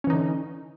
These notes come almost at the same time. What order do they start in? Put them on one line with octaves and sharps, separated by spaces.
C#4 E3 D#4 D3